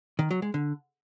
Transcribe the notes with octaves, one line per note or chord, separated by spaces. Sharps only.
D#3
F#3
G#3
D3